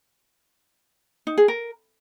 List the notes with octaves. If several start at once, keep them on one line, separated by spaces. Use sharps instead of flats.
D#4
G#4
A#4